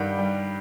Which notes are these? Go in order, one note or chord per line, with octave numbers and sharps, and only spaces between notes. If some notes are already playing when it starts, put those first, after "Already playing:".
Already playing: G2 D#3 G3 F#5 G5
G3